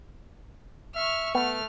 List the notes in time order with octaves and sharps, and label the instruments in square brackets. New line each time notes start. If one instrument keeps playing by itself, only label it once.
[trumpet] E5 [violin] C#6 F6
[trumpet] A3 [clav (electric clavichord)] B3 [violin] F6